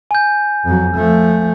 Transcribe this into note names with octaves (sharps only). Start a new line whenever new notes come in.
G#5 G6
F2 F#3
F3 A3